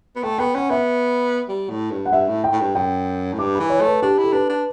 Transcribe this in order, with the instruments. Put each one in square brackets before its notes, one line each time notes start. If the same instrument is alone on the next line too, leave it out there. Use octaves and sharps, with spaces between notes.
[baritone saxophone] B3
[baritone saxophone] A3 [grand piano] G5
[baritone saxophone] B3 [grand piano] G5
[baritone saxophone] C#4 [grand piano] F#5
[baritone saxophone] B3 [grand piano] E5
[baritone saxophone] G3
A2
G2
[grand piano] F#5
[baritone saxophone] G2 [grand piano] E5
[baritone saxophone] A2
[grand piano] G5
[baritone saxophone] A2
G2
[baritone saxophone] F#2 [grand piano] G5
[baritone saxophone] A2
[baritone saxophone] G2 [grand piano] D6
[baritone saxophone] E3 [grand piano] B5
[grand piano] C#5
[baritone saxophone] A3
[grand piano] B4
[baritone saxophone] D4 [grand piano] G4
[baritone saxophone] E4
[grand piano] A4
[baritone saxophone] D4 [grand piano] B4
[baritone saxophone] D4